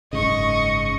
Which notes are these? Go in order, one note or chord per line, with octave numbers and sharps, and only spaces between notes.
F#1 G#2 C#3 D#5 C#6